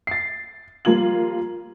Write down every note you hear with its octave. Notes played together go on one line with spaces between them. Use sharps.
A6 C7
F3 G3 A#3 F4 G#6 F#7